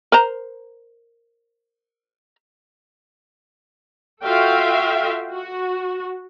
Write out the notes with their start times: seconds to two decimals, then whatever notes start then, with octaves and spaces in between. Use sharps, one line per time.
0.12 A#4 C5 A#5
4.24 F4 F#4 A4 E5 F5 G5
5.32 F#4